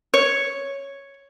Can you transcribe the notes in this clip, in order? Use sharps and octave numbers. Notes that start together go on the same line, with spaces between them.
C#5